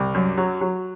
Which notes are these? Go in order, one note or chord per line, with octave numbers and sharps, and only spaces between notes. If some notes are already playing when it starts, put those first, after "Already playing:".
Already playing: C2
F#2
F#3
F#3